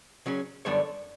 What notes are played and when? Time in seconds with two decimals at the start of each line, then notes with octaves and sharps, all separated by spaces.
0.26 C#3 F#3 C#4
0.65 F#2 D3 G3 B3 D4 A4 C#5